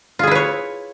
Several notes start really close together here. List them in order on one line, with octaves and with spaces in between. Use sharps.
F4 G#4 E4 B4 C#5